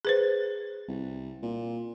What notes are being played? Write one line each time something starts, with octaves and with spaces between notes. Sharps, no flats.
G#4 B4 C5
C2
A#2